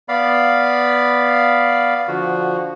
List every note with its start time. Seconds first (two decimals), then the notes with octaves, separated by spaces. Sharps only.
0.09 B3 D5 F5 B5
2.08 D3 F3 F#4